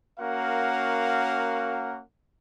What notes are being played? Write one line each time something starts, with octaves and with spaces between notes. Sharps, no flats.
A#3 C#4 F#4 A#4 F5 F#5